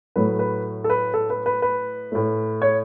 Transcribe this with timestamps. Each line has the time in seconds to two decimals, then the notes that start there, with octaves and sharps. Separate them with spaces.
0.16 A2 F#3 A3 B4
0.39 B4
0.84 A4
0.90 B4
1.14 A4
1.30 B4
1.46 B4
1.62 B4
2.12 A2 A3
2.62 C#5